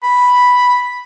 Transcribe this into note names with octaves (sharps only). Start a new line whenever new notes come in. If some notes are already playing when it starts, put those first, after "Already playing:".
B5